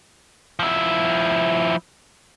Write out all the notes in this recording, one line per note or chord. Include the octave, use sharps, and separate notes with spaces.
F3 E4